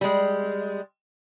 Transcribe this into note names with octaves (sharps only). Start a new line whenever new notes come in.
G3 G#3